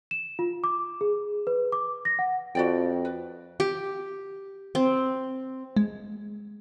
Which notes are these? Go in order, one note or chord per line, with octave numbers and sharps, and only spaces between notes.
E7
F4
D6
G#4
B4
D6
A#6
F#5
F2 F#4 D5 G5
B4
G4
C4
G#3